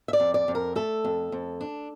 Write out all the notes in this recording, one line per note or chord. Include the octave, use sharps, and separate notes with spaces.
E5
D5
F2
D5
F2
A#4
A3 A4
F2
F2
D4